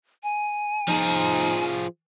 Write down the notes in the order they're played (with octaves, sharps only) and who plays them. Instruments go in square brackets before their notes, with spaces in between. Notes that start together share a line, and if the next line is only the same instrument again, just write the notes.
[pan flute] G#5
[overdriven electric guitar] F3 G#4 [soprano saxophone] D#4